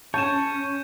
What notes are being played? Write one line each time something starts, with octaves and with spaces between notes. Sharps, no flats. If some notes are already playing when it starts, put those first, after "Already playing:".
C#4 C#5 A5 G6 D#7 E7